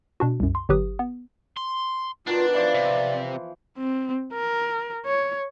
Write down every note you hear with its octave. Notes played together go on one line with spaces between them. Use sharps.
B2 D4 F#4
C2 F#2
C6
G1 F#3 G4 B4 D#6
B3
C6
B2 D#3 D4 F4
E3 F3 C5 D5
C3
C4
A#4
C#5